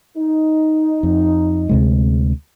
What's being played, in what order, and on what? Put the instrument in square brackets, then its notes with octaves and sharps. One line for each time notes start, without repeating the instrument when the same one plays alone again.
[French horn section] D#4
[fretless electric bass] F2
D2 C3 G#3